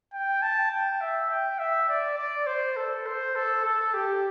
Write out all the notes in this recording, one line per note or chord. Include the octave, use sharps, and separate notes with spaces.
G5
A5
G5
E5
G5
E5
D5
D5
C5
A4
C5
A4
A4
G4